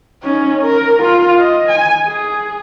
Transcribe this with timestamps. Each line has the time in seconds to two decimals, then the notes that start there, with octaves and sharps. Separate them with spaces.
0.23 C#4 D#4
0.62 A#4
1.03 F4
1.39 D#5
1.69 G#5
2.05 G#4